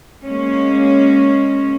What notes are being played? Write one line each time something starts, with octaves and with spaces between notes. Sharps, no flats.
G#3 A#3 C#4